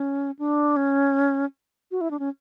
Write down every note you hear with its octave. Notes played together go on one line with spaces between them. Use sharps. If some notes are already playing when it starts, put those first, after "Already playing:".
Already playing: C#4
D4
C#4
F#4
E4
D4
C#4